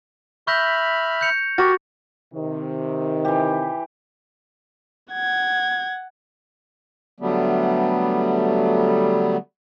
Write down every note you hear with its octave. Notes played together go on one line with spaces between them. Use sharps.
E5 B5 C#6 F6 G6 A#6
G6 C#7 F7
F#4 G4 A#4 A6 A#6
C3 D#3
E3 G4
F#5 G#6
D3 F#3 G3 A3 B3